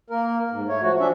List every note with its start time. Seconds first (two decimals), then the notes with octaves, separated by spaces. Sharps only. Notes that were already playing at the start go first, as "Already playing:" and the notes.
0.10 A#3 A#4
0.51 G#2
0.69 A3 C#5
0.82 F3 F#4
1.00 F3 C#4 D4 E5